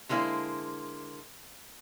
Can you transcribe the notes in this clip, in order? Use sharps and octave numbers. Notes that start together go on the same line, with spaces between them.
D3 G#3 A#3 E4 C5